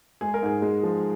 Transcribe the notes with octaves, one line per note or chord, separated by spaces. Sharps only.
G#3 G#4
A#4
G#2 G#4
G#3
F3